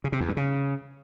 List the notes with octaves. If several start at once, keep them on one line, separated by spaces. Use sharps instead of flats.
C#3
C3
E2
G2
C#3